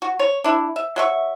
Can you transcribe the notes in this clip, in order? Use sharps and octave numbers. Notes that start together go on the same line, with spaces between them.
F#4
C#5
D4 E4
E5
F#3 E5 C#6